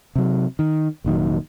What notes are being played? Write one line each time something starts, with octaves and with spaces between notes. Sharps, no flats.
C3 F#3
D#3
F1 A#2 D#3 F#3